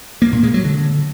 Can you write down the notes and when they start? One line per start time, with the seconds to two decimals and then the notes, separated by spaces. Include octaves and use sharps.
0.22 A#3
0.32 A#2
0.43 G#3
0.54 F#3
0.65 D3